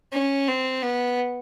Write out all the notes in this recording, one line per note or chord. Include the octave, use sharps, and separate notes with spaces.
C#4
C4
B3